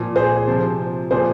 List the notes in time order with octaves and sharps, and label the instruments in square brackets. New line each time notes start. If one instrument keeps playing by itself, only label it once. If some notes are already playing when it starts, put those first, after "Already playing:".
Already playing: [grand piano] A#2 F3
G#4 C5
C3 F3
A#2 F3 G#4 C5